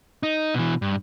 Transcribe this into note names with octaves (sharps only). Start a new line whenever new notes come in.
D#4
B2 E3
G2